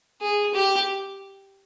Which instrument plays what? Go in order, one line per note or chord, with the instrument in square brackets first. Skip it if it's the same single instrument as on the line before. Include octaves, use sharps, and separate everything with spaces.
[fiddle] G#4
G4